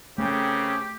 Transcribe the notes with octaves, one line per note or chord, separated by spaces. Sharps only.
C#3 A3 C4 G4 A#4 G5